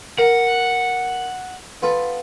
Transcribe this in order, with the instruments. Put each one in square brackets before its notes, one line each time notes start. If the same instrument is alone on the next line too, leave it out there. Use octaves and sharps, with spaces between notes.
[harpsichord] A#4 [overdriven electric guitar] F#5
[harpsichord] B3 F4 A4